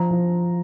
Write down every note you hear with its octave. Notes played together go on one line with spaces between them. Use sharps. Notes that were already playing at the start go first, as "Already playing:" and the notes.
Already playing: F3 A#5
F3